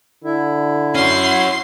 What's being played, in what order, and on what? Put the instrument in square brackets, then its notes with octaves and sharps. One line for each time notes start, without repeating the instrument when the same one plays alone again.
[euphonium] D3 [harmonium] E4
[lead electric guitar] C#4 F#4 [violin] C6 C7